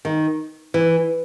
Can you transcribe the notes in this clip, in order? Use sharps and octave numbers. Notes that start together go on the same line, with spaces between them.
D#3
E3